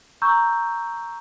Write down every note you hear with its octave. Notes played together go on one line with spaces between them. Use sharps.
A#5 C#6 E6 G6